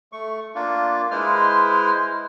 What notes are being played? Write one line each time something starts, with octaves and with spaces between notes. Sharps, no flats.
A3 C#6
A#3 D4 F4
G#3 E4 B4 C5 F6